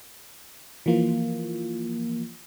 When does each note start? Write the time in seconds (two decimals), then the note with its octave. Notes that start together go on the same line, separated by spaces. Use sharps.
0.86 E3 F3 A#3 F4